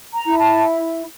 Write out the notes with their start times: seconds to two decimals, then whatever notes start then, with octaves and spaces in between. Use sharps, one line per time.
0.13 A#5
0.25 E4
0.38 A5